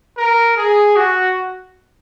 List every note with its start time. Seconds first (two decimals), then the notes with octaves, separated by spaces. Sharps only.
0.17 A#4
0.57 G#4
0.96 F#4